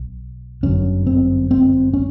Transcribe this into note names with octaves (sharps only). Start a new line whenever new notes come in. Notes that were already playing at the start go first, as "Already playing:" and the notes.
Already playing: B1
G1 F#2 D3 C#4
C4
C4
C#4